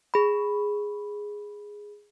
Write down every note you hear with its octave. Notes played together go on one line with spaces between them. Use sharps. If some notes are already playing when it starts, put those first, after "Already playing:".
G#4 B5